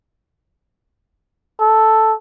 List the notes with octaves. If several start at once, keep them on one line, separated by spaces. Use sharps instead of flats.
A4